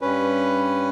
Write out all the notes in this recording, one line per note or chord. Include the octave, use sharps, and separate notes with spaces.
G2 C#4 B4